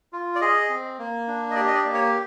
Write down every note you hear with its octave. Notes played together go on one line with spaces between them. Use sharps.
F4
D5
G#4 D#5
C4
A#3
D4
D#5
G4 D5
D#5
D5
A#3
C#5